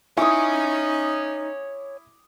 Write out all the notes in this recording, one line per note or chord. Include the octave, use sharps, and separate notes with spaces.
D#4 E4 C#5 G#5 D6 D#6